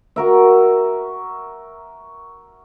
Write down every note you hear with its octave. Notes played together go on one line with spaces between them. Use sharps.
F#4 A#4 E5